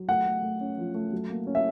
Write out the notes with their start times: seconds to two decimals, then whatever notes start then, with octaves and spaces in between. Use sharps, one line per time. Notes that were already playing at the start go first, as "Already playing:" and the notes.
Already playing: F#3
0.08 A3 F#5
0.26 A3
0.43 A3
0.61 C#4
0.78 F3
0.94 A3
1.12 F#3
1.30 A#3
1.47 C#4
1.55 E5